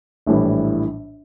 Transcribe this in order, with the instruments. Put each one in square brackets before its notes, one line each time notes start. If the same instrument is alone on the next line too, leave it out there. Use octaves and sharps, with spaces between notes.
[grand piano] A#1 A2 E3 G3